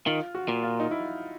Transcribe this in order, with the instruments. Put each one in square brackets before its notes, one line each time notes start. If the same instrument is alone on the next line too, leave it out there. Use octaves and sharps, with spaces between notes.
[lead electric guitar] D#3 [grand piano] F4
[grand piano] F#4
[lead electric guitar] A#2
[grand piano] F4
D#4
E4